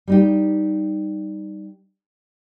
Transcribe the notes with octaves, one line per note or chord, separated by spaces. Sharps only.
G3 D#4 G4